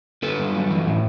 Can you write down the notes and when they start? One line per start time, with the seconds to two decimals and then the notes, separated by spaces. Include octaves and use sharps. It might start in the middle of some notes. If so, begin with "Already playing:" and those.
0.23 D3 A4 B4
0.39 G2
0.55 F#3
0.70 E3
0.86 A2